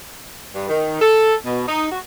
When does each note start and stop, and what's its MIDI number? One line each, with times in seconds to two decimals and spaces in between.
0.55 0.69 43
0.69 0.99 51
1.01 1.36 69
1.46 1.63 47
1.68 1.88 63
1.92 1.99 66